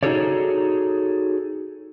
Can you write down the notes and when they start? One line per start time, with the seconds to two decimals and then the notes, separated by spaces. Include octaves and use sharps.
0.03 D#4 F#4 G#4 A4 C#5 D5